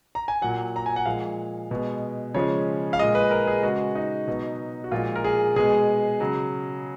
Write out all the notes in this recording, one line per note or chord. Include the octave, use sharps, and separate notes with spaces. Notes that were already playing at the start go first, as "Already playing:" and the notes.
A#5
G#5
A#2 F#3 F#5
A#5
G#5
F#5
A#2 F3 G#3 F5
B2 G#3
C#3 F3 G#3 C#5
F5
A#2 G#3 D#5
B4
A#4
G#4
C#3 G#3 F#4
D#4
B2 F#3
F#4
A#2 F3 G#3 F4
A#4
G#4
B2 G#3 G#4
C#3 F#3